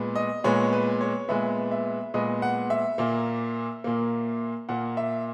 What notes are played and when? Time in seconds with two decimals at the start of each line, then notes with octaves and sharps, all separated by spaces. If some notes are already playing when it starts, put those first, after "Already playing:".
Already playing: A#2 G#3 B3
0.15 D#5
0.44 A#2 G#3 B3 C#5
0.73 B4
1.01 C#5
1.29 A#2 G#3 B3 E5
1.71 E5
2.14 A#2 G#3 B3 D#5
2.42 F#5
2.70 E5
2.98 A#2 A#3
3.84 A#2 A#3
4.69 A#2 A#3 F#5
4.97 E5